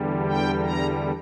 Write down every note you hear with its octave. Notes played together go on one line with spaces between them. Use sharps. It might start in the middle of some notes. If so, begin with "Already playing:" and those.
Already playing: E2 D3 G3
G5
A#5